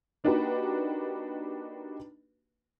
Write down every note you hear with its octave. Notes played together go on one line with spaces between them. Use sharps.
A#3 D4 D#4 F#4 G4 B4